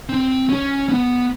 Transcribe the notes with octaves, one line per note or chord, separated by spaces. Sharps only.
C4
C#4
B3